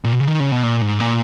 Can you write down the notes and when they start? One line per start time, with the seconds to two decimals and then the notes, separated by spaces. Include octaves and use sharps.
0.04 A#2
0.13 B2
0.20 C#3
0.27 D#3
0.40 C#3
0.52 B2
0.63 A#2
0.82 G#2
1.00 A#2